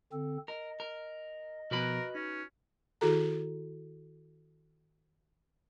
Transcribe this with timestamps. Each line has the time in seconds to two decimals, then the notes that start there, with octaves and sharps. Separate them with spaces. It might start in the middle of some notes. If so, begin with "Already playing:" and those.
0.12 D3 C4 A4
0.48 A#4 D#5
0.80 A#4
1.71 B2 F3 B3 F#4 A#4 B4 B5
2.15 C#4 D#4
3.01 D#3 E4 F#4 G#4 A4 A#5